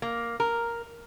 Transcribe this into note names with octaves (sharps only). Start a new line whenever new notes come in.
A#3
A#4